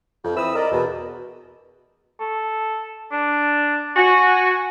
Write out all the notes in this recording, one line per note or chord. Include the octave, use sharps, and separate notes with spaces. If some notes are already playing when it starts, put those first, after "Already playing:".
F2
E3 C4 E4 B4 D#6 E6
A#4 D5 D#5
E2 B2
A4
D4
F#4 G#5